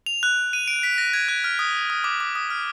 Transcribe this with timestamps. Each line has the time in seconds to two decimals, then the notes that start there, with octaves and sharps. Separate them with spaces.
0.06 F7
0.23 F#6
0.53 D#7
0.68 D7
0.83 B6
0.98 A#6
1.13 G#6
1.28 F#6
1.44 F6
1.59 D#6
1.90 D#6
2.04 D6
2.20 D6
2.35 D#6
2.50 F6